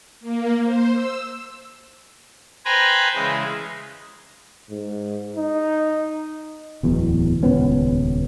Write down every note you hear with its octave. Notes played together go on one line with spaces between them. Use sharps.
A#3
C5
E6
B4 C5 G5 G#5 A#5 B5
C#3 E3 G#3
G#2
D#4
D1 E2 B2
D#1 C#2 B3 C#4